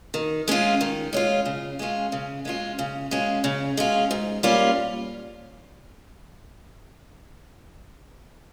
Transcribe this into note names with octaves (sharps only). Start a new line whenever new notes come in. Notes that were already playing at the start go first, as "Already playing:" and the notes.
D#3
G#3 C#4 F4
D#3
G#3 C#4 F4
C#3
G#3 C#4 F4
C#3
G#3 C#4 F4
C#3
G#3 C#4 F4
C#3
G#3 C#4 F4
G#2
G3 A#3 C#4 F4